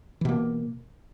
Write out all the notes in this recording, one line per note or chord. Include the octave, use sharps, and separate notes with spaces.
B2 E3 A#3